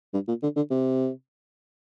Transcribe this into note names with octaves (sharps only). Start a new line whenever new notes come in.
G2
A#2
D3
D3
C3